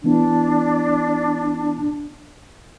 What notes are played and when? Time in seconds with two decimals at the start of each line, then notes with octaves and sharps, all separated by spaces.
0.03 E3 B3 D4 E4